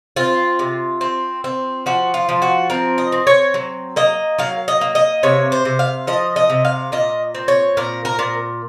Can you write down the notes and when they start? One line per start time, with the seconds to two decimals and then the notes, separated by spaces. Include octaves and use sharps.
0.16 C4 F4
0.59 C3
1.01 C4
1.44 C4
1.86 F3 F#4
2.14 F4
2.29 F3
2.42 F#4
2.70 C4 A#4
2.98 D#5
3.12 C4
3.27 C#5
3.54 F#3
3.96 A#3 D#5
4.38 F#3 F5
4.68 D#5
4.81 A#3
4.95 D#5
5.23 C3 C#5
5.52 C5
5.65 C3
5.79 F5
6.07 F3 D#5
6.36 D#5
6.50 C3
6.65 F5
6.92 A#2 D#5
7.35 C4
7.48 C#5
7.77 A#2 A#4
8.05 A#4
8.19 A#2